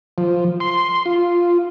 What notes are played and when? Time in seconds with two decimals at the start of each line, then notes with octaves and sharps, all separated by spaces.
0.18 F3
0.60 C6
1.06 F4